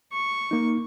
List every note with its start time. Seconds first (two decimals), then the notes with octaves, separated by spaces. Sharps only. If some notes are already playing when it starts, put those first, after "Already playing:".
0.12 C#6
0.51 A#3 D#4